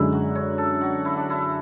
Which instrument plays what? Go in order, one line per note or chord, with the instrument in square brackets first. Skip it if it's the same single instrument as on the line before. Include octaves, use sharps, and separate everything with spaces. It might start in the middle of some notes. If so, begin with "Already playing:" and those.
Already playing: [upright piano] F#2 D3 G#3 [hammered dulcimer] E4
[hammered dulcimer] F#4
C#5
A4
F#4
E4
D4
E4